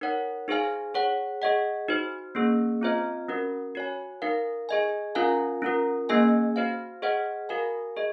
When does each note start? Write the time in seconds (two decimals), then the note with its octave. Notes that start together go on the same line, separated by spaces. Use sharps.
0.01 D#4 A#4 C#5 F#5
0.48 D#4 G#4 C5 F5 G#5
0.94 G#4 C#5 F#5
1.42 G#4 D#5 F#5
1.88 D#4 F#4 C5
2.35 A#3 C#4 G#4
2.81 C4 F4 C5 D#5
3.29 C#4 F#4 A#4
3.75 F#4 C#5 G#5
4.22 D#4 A#4 F5
4.69 G#4 D#5 G#5
5.15 C#4 F4 A#4 F5 G#5
5.62 C#4 F4 A#4
6.09 A#3 C#4 G#4 D#5 G#5
6.56 F#4 C5 F5
7.02 G#4 C5 D#5 F#5
7.49 F#4 A#4 F5 G#5
7.97 G#4 D#5